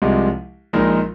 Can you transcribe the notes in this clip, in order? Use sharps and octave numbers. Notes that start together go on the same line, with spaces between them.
C2 C3 F3 G#3
A#1 A#2 G#3 D#4 A#4